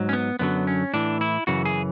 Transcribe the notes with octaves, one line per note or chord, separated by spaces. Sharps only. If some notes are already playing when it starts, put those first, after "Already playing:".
Already playing: G#2 F#3
C#4
B3
F#2 D3 F#3 B3
C#4
A2 E3 D4
E4
F#2 C#3 E3 F#4
G#4